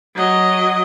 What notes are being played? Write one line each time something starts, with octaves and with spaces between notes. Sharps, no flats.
F#3 D#5